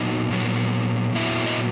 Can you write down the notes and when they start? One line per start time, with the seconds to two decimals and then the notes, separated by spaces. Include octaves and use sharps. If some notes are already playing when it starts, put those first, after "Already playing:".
Already playing: A#2 F#3 B3 D#4 D#5
0.30 A#2 F#3 B3
1.15 A#2 F#3 B3 E4 E5
1.46 D#5